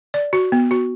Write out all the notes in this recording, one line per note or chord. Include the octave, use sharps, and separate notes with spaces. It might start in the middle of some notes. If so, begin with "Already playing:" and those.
D5
F#4
B3
F#4